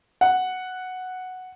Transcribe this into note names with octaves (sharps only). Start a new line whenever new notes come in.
F#5